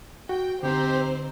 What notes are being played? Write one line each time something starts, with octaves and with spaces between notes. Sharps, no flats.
F#4 G5
D3 C4 D#4 G4 C5